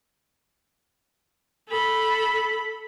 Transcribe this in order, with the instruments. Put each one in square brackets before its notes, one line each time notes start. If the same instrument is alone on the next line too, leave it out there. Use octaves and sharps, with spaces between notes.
[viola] A4 B5